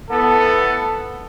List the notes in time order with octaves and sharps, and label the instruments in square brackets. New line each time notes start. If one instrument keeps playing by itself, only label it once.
[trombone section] A2 B3 [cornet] A4